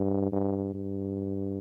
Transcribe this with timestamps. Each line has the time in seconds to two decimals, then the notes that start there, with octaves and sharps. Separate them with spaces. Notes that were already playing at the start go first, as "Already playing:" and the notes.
Already playing: G2
0.32 G2
0.74 G2